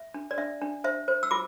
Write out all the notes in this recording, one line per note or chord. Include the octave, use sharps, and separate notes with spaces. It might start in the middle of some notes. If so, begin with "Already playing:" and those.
Already playing: E5
D4
D5
D4 E5
D4
C5 E5
C5
E6
F4 D6